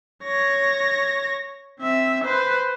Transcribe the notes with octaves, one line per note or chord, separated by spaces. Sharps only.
C#5 A#6
C4 E5
B4 C5